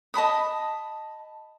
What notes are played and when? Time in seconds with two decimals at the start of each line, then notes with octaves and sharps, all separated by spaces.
0.14 D#5 A5 B5 D#6